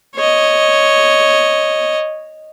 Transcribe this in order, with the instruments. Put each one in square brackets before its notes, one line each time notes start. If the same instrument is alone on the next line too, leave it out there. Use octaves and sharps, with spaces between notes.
[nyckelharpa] C#5 D#5